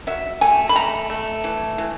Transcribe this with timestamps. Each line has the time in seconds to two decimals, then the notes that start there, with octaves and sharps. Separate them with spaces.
0.07 F#3 E5
0.41 A3 G#5
0.69 B5
0.76 A3 A#5
1.10 A3
1.44 E3
1.78 E3